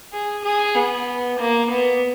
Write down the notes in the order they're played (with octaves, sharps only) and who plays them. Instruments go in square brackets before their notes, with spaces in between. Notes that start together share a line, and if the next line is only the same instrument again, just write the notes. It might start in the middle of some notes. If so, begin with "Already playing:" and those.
[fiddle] G#4
G#4
B3
A#3
B3